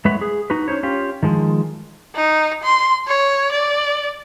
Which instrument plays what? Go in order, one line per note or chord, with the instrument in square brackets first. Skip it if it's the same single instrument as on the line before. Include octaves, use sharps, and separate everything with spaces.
[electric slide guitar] G#3 E4 B4 C#5 E5 F#5
G#4
D#4 F#4 B4
C#4 D#4 C5 C#5
C#4 F4 G4
D#3 F3 G#3
[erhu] D#4
C6
C#5
D5